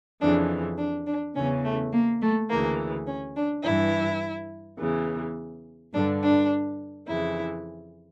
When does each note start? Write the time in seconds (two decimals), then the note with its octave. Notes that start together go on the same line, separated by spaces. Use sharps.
0.21 F2 C#3 E3 D4
0.78 D4
1.07 D4
1.35 E2 C#3 E3 C#4
1.65 A3
1.92 A#3
2.21 A3
2.49 D2 C#3 E3 A#3
3.07 C#4
3.36 D4
3.64 G2 E3 E4
4.79 E2 C#3 E3
5.93 G2 D3 D4
6.22 D4
7.07 F2 C#3 E3 E4